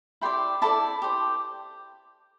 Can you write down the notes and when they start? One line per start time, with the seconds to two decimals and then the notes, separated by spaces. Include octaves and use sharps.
0.21 E4 G4 D5 G5 C6
0.62 E4 A4 D5 A5 D6
1.02 G4 C5